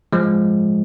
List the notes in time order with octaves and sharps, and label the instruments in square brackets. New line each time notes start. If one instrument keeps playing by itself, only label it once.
[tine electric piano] F3 G#3